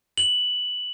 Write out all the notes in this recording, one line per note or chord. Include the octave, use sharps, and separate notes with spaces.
F#7